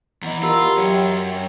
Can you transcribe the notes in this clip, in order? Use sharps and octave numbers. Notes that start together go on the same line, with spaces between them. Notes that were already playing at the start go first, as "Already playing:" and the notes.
E2 E3 D#5 F#5 A#5
F4 G4 A#4 D#5 A#5 B5 E6
F#2 C#5 F#5 G5 G#6 C#7